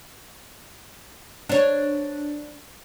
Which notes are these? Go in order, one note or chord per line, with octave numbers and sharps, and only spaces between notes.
D4 C#5